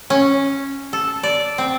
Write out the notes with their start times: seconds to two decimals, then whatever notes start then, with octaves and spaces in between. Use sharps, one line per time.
0.10 C#4
0.93 A4
1.23 D5
1.58 C4